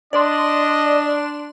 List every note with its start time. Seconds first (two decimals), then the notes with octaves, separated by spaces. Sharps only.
0.13 D4 D5 D#5 C6